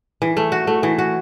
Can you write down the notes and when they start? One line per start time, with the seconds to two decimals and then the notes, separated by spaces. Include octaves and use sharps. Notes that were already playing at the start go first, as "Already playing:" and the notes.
0.22 E3
0.37 A3
0.52 F#4
0.67 A3
0.83 E3
0.99 F#4